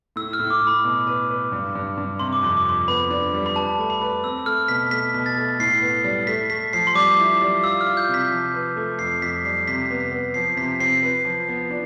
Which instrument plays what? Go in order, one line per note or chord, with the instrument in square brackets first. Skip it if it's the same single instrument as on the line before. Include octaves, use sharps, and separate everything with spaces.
[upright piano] A2 [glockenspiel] E6
[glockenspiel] F6
[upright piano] A2
[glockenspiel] D6
[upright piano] A2
[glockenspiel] B5
[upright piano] B2
B4
B4
G2
G2
G2
[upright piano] C3 [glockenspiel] C6
[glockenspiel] D6
[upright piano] F2 [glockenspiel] C6
[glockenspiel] D6
[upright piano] F2 [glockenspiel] C6
[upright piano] B3 [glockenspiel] B5
[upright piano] D4
G3
[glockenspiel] B5
[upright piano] B4 [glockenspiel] A5
[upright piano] A3
[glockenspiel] B5
[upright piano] B4
[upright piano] C4 [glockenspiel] E6
[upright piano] A3 [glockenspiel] F6
[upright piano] B2 [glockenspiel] B6
[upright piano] A3 [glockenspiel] B6
[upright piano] B2
[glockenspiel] A6
[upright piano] A3
[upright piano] A2 [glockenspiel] C7
[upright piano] B3
G3
[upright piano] A3 [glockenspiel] B6
[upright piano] A3 [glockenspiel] B6
[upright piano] F3 [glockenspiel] C7
[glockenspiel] C6
[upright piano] G3 [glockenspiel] D6
[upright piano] E4
G3
[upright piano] F4 [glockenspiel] E6
[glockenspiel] F6
[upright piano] F4
[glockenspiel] G6
[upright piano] C3
[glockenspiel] B6
[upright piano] F3
B4
A3
[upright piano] F2 [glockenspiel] C7
[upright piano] F2 [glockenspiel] B6
[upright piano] G3 [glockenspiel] C7
[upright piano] C3 [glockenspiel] B6
[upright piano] B3
[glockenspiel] B6
[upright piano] B3
[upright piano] F3 [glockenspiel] C7
[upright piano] C3 [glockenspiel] B6
[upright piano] C4 [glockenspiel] C7
[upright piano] B4
F3
B3
D4